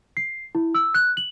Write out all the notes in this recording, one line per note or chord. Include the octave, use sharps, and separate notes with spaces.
C7
E4
E6
F#6
F#7